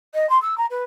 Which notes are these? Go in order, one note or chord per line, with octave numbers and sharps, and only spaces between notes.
D#5
C6
E6
A#5
B4